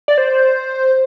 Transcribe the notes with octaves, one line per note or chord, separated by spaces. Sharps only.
D5
C5